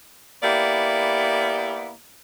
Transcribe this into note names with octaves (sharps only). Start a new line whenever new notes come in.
A#3 B3 E4 G4 D5